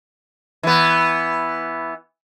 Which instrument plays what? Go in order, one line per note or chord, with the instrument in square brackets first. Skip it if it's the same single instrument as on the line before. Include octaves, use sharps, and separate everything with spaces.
[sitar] E3 B3